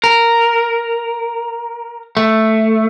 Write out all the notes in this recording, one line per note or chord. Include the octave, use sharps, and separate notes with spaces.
A#4
A3